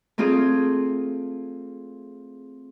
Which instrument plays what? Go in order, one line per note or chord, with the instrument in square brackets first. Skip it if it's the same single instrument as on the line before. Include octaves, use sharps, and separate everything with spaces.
[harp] A3 C4 F4 G#4